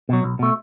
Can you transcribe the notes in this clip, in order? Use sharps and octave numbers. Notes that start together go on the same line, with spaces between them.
B2 F#3
B1
B2 A3